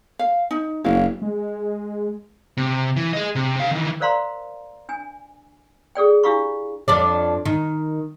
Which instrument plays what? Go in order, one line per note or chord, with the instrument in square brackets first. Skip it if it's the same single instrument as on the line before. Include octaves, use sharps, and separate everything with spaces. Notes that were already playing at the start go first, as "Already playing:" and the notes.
[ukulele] F5
D#4
[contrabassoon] F#1 [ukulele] E4 F#4 F5
[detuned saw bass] G#3
[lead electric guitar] C3
E3
G#4 D#5
C3
C3 F5
D#3 E3
[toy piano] A#4 C5 D5 F5 A#5 C6
D4 G#5
G#4 A4 D5 G5
D4 E4 G4 F5 B5 C#6
[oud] F2 D4 D5
D#3